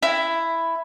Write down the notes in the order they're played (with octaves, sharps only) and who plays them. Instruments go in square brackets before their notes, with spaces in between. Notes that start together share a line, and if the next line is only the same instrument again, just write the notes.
[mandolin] E4